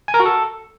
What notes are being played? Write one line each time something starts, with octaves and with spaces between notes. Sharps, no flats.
G#5
A#4
F#4
A4